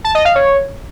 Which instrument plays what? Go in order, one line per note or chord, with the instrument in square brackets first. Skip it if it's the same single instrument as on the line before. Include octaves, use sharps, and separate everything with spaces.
[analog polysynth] A5
D#5
F5
C#5